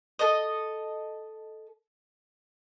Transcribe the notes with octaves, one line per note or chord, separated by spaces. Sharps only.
A4 D#5